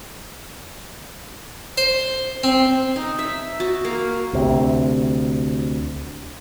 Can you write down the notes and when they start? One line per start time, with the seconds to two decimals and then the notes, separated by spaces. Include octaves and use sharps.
1.78 C5
2.44 C4
2.96 D#4
3.19 E5
3.60 F#4
3.85 A#3
4.33 D2 C3